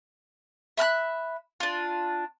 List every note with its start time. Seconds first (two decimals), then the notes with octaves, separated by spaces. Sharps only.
0.77 E5 B5 F6 F#6
1.60 D4 F4